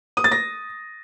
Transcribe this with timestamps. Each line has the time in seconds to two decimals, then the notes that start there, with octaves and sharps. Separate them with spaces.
0.17 D#6
0.24 A6
0.32 A#6